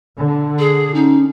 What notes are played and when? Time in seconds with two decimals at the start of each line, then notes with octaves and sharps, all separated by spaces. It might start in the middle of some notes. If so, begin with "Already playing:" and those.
0.18 D3
0.59 G#4
0.94 C#4 D#4